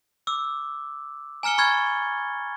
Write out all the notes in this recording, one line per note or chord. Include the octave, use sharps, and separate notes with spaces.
D6 E6
G#5 A#5 F6 C#7 G7
B5 C#6 F6 G#6 A6